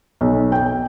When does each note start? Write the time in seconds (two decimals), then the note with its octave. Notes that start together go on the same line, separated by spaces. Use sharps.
0.21 B1
0.52 G5